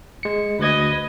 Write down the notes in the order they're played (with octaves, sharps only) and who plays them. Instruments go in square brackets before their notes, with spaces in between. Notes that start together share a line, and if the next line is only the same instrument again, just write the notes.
[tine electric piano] G#3 C#7
[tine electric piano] D2 G#6 [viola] B4 D#5